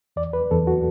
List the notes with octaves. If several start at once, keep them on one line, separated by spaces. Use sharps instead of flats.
E2 D5
B4
E2 A4
F#4